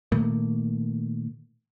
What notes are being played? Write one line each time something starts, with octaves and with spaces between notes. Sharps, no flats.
A#2 D#3 A3 A#3